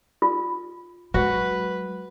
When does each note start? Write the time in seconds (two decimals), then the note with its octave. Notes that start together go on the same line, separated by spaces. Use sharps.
0.22 F4
1.14 F#3 G#3 F#4 B4